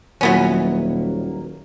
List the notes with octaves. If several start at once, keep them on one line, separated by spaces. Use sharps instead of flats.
D#1 E3 F#3 A#3 B3 C#4